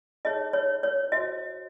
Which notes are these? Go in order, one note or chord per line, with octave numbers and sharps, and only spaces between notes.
D#4 G#4 C#5 D#5
C#5
C#5
F#4 C5 D#5